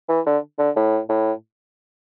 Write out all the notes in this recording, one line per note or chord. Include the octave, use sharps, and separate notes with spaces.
E3
D3
D3
A2
A2